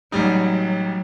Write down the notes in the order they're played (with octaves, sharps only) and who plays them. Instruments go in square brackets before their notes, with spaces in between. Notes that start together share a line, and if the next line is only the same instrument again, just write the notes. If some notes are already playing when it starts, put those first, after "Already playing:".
[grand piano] A1 G3 D#4 [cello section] F#3